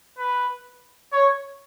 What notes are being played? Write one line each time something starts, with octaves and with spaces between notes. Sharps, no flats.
B4
C#5